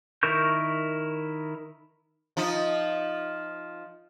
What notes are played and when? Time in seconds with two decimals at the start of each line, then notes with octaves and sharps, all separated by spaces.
0.23 D#3 E4 A#4 C#6 G6
2.37 F3 D#4